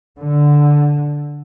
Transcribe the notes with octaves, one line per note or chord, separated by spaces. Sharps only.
D3